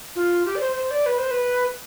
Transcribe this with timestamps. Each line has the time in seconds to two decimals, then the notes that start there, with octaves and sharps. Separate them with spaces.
0.16 F4
0.46 G4
0.55 D5
0.60 C5
0.76 C5
0.91 D5
1.06 B4
1.18 C5
1.31 B4